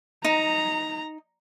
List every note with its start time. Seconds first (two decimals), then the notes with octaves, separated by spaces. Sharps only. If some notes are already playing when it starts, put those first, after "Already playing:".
0.25 D#4 A#5